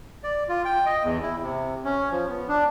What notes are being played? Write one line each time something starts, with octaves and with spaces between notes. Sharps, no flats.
D5
F4
G5
D#5
E2
E4
C3
C#4
F3
B3
D4